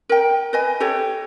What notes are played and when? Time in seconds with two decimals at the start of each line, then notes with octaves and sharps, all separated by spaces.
0.09 A#4 G5
0.53 B4 D#5 G#5
0.80 G4 A4 C#5